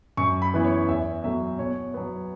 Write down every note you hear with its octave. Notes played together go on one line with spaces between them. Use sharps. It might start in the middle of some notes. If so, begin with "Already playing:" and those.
F#2 C#6
B5
E3 B3 E4
C#5
E2 E5
B2 F#3 A3 E5
B2 C#5
F#3 B3